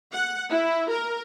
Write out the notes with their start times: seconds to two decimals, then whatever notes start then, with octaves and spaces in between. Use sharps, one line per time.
0.12 F#5
0.50 E4
0.90 A#4